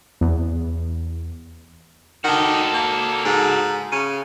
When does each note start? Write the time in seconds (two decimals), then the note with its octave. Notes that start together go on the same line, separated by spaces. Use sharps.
0.21 E2
2.24 D#3 F#4 A4
2.74 A#3
3.25 G#2
3.92 C#3